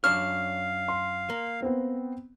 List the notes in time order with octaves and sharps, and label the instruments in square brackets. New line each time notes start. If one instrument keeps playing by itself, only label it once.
[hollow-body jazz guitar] F#2 D4 C#5 [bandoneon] F5 [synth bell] F6
[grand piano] C6
[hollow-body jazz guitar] A#3
[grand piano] B3 C4